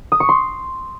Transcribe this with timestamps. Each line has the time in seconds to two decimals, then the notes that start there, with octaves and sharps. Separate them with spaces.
0.12 D#6
0.20 C#6
0.29 C6